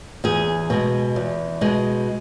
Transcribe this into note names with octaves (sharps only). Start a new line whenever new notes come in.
E2 G#4
B2 G#3
E2
B2 G#3